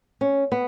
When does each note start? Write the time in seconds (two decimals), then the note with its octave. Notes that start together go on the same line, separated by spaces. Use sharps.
0.21 C#4
0.52 B3